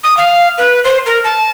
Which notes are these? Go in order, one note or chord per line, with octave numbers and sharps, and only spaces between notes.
D#6
F5
B4
C5
A#4
A5